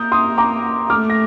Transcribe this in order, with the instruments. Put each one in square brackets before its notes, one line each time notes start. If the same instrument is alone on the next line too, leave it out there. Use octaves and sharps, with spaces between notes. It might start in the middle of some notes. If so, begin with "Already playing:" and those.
Already playing: [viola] A#3 [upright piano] D#6 G6
[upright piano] C6 D#6
A#5 D6
[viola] A3 [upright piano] D6 F6
[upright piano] A#6